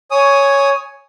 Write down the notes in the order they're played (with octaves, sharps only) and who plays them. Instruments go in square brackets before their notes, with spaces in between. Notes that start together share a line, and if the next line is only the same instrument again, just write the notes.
[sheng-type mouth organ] C#5 G#5 D#6